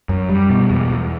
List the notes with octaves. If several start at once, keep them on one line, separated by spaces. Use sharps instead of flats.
F#2
G3
B2
E2
E2